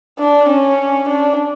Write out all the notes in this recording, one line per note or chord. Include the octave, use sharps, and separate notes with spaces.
D4
C#4
D4